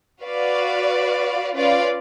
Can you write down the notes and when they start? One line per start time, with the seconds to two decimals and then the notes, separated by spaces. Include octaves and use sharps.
0.22 F#4 B4 D5 F5
1.53 C#4 F4 B4 D5 F5